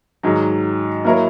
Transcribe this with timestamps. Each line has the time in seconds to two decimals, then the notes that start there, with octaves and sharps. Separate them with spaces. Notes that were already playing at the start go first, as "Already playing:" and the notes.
0.23 G#2 D#3 F#3
1.05 F#3 A#3 E4 A#4 C#5